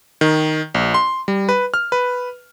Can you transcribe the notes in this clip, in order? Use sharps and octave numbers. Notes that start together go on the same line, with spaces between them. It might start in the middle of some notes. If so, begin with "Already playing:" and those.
D#3
A#1
C6
G3
B4
F6
B4